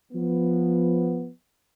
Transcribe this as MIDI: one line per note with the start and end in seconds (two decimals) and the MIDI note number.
0.12 1.28 53
0.12 1.28 59